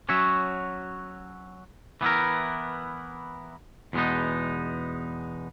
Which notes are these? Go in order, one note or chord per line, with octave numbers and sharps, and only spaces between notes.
F#3 C#4 F#4 C#5 E5
E3 B3 E4 A#4
E2 B2 G#3 B3 D#4